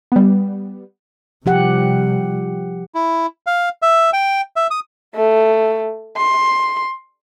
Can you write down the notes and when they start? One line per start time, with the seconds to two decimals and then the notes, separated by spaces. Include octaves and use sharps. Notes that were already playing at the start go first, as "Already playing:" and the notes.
0.12 G3 B3
1.46 C3 F3 G3 G4 F#5
2.95 E4
3.47 F5
3.82 E5
4.13 G5
4.56 E5
4.71 D#6
5.15 A3
6.17 C6